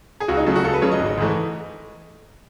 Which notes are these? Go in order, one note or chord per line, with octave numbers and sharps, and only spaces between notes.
G#4
C#2 F#4
D#4
C#3 F#3 A3
F#4
C#2 A4
B4
C#3 F#3 A3 C#5
D#5
G#1
G#2 E3 A3